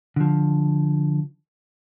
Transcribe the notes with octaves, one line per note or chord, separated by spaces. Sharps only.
D3 F3